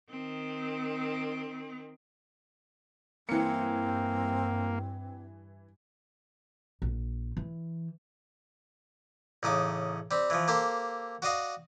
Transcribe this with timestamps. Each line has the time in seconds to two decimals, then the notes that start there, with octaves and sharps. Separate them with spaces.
0.10 D#3 C4
3.29 G2 E3 A#3 C4 C#7
6.82 A#1
7.37 E3
9.43 A1 C#3 D#4 D6
10.11 G3 C4
10.30 E3 F3
10.48 A#3 G4 A4 C5
11.22 F#4 D5 D#5 F5